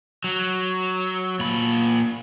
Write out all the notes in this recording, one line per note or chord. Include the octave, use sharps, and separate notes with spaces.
F#3
A#2 B5